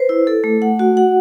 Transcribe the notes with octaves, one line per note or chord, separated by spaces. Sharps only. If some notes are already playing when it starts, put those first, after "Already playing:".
Already playing: B4 C5
E4
A4
A3
F#5
F#4
F#5